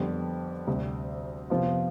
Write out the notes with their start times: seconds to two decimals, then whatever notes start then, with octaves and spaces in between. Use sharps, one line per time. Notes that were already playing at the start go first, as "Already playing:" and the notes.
Already playing: F2 D3 G3 B3
0.67 D2 C3 G3
1.50 F2 C3 F3 B3 F4